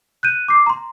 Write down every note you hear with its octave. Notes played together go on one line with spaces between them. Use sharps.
F#6 G6 D#7
D6 C7
A#5 C6